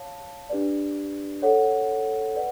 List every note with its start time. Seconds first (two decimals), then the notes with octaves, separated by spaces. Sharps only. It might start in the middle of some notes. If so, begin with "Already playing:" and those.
Already playing: C#5 F5 A5
0.50 D4 G4 B4 D5
1.42 A4 C#5 F#5
2.35 B4 D5 F#5